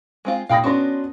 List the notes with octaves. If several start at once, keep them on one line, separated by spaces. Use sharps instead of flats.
G#3 C4 F4
A#2 F5 G5 B5 D#6 A#6
B3 C#4 D4 F#4 C6